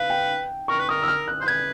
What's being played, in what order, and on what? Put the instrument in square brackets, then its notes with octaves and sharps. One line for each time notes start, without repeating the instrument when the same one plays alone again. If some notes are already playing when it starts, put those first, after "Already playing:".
Already playing: [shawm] B4 [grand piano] F5
[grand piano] G5
[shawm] A#4 [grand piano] C#6
[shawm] B4
[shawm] A#4 [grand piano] D#6
[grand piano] E6
F6
F#6
[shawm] C5 [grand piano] G6
[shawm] B4 [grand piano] G#6